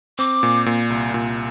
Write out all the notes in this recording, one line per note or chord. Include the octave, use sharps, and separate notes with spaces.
C4 D6
A#2
A#2
C2
A#2